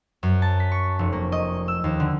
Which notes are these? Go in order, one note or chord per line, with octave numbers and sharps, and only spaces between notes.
F#2
A5
B6
C#6
F1
A#3
D#5
E6
D#2
D3